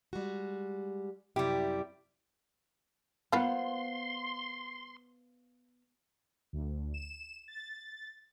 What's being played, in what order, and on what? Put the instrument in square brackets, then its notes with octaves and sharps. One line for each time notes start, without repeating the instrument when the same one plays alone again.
[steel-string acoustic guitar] G3 G#3 F#4
[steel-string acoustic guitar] F#2 C3 E4 [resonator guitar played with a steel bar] G3 G4
[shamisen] A#3 F4 B4 [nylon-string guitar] B3 [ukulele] C5 F5 F#5 [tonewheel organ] C6
[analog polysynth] D2
E7
A6